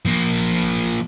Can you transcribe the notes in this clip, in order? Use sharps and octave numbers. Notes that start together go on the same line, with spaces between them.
F3 A#3